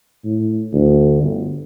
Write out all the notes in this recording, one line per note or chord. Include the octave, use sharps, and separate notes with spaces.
A2
D2
G1